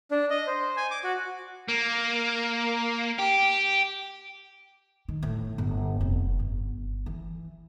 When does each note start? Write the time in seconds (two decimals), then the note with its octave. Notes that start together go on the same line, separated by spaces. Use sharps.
0.11 D4
0.30 D#5
0.47 C5
0.77 G#5
0.91 D6
1.04 F#4
1.68 A#3
3.19 G4
5.08 D#3
5.23 A2
5.58 G1
6.01 F1
6.39 G1
7.06 E3